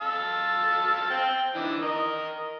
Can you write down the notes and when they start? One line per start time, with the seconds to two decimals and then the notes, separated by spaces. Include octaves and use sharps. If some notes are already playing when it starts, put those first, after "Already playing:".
0.02 F5 A5 E6
1.10 C4 G5
1.55 E3 D4 D#4
1.82 A#4 D#5